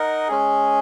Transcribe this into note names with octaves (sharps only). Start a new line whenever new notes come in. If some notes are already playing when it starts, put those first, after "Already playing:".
Already playing: D#4 A#4 D#5 F#5
G#3 C#4 G#4